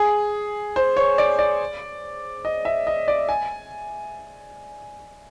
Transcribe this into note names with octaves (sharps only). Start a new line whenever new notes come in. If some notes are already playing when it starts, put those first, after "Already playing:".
Already playing: G#4
C5
C#5
D5
D5
D#5
E5
D#5
D5
G#5